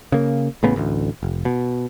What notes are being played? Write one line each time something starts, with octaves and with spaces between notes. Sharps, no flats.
C#3 A#3
A1 A2 C#3 B3
A1 D2
F1
B2